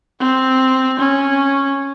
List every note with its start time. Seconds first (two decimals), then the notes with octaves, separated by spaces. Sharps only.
0.20 C4
0.99 C#4